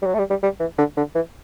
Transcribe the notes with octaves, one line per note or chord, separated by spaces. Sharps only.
G3
F#3
A3
G3
G3
G3
E3
D3
D3
E3